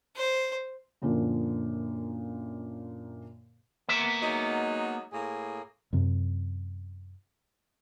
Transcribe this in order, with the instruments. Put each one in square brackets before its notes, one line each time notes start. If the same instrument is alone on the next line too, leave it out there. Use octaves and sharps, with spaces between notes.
[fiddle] C5
[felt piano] F#2 A#2 D3 F3
[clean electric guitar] A#3 B3 E5
[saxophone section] F#3 G#3 D#4
A2 A#3 G#4
[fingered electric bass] F#2 C3